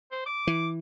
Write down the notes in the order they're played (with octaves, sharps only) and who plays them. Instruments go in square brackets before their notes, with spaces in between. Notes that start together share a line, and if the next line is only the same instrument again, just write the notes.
[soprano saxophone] C5
D6
[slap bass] E3